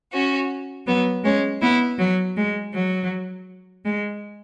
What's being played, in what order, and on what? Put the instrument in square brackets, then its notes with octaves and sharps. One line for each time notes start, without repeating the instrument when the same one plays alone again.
[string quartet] C#4 F#4
F#3 B3
G#3 C#4
B3 E4
F#3
G#3
F#3
G#3